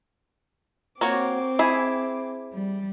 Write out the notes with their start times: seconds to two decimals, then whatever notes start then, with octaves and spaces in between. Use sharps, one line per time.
1.01 A#3 C4 F#4 C#5 D6
1.59 E4 G#4
2.53 G3